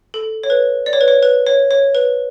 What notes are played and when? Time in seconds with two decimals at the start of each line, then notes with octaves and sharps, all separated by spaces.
0.14 A4
0.43 C#5
0.50 B4
0.86 D5
0.93 C#5
1.01 B4
1.08 C#5
1.23 B4
1.46 C#5
1.71 C#5
1.95 B4